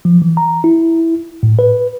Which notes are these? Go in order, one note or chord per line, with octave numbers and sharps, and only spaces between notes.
F3
E3
A#5
E4
A2
B4